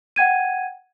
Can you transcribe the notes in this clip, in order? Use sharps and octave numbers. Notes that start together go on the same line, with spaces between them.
F#5 G5 G#6 D#7